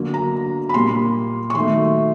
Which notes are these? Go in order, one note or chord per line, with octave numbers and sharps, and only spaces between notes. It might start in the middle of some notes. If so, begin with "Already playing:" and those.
Already playing: D3 F#3 A#3
A#5
B5
A#2 G3 A#3 C6
C#6
D#3 F#3 A3 C6